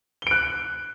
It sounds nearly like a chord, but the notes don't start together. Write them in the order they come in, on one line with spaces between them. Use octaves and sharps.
G7 D7 F#6